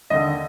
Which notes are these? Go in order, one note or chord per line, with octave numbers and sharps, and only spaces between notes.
D#2 D3 D#5